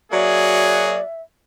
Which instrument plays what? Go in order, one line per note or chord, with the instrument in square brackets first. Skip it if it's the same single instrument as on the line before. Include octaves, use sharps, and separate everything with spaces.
[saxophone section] F#3 A#3 F#4 [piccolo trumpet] G#4 [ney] D5 [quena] E5